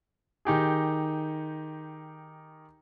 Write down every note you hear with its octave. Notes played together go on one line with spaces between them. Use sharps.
D#3 D#4 G4 G#4